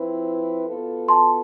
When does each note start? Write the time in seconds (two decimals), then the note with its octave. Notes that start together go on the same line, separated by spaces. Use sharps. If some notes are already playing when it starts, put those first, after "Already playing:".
Already playing: F3 C4 E4 B4
0.66 B2 B3 F4 A4
1.08 A5 C6